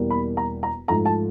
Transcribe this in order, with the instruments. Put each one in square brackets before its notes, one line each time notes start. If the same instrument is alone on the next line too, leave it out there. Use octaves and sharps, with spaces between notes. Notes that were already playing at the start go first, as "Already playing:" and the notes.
Already playing: [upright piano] E2 B2 G3 A#3
B5
A#5
A#5
G#2 F3 A3 A#5
A5